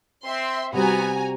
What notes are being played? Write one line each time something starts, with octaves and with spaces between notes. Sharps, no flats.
C4 E5 C6
C3 G3 B3 C4 F#4 G#5 A#5